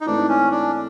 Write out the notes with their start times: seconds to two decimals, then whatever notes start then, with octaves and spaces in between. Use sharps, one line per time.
0.01 D#4
0.06 G#2 E3 A3 C4 D4
0.29 C#4
0.51 D4